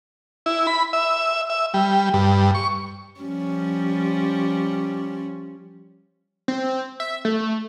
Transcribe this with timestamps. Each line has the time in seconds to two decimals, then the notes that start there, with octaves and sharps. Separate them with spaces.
0.46 E4
0.67 B5
0.93 E5
1.50 E5
1.74 G3
2.14 G2
2.55 C#6
3.20 F3 G3 C#4
6.48 C4
7.00 E5
7.25 A3